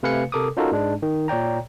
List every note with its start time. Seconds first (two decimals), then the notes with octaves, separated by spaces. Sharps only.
0.03 C3 A3 B4 F5 G#5 C#7
0.32 C3 A4 A#4 D6 D#6
0.57 C#4 D#4 F4 F#4 A4 A#4
0.72 G#2 G#3 D4
1.02 D#3
1.28 A#2 C#5 D5 G5 A#5